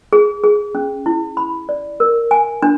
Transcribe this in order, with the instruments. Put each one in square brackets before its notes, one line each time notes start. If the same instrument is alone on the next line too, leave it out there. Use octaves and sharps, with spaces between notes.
[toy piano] G#4
G#4
C#4
E4
B5
D5
A#4
G#5
D4